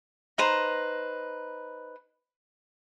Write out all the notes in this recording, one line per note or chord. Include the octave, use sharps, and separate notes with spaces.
D#4 B4 C5 A#5